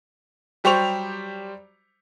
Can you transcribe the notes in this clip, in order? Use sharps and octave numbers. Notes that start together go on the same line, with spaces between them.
F#3 G3 G4 C5 C#6 F7